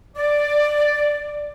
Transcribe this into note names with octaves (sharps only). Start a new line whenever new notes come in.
D5